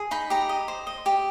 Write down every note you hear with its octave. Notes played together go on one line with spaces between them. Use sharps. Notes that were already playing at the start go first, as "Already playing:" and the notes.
Already playing: G#4
D#4 B5
G4 A#5
D#5
C5
D#5
G4